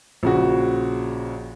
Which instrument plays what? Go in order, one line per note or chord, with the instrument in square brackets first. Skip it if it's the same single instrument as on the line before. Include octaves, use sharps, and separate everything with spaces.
[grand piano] A#1 C#3 F#4